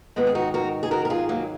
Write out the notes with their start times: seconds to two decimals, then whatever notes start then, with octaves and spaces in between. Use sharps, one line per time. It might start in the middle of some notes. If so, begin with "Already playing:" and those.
0.16 G#2 D#3 G#3 B3
0.27 G#4
0.35 D#4 F#4
0.54 F#4 A#4
0.83 G#4
0.91 F#4 A#4
1.05 A#4
1.10 F4 G#4
1.29 F#3 A#3